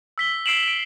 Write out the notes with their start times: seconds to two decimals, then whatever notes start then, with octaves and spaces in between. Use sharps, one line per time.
0.18 E6 B6 G7
0.46 E6 C7 D7 E7 F#7
0.68 D7